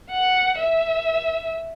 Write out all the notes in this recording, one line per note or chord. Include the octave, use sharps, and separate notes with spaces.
F#5
E5